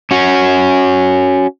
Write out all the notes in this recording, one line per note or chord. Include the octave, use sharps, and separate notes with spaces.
C#4 F#4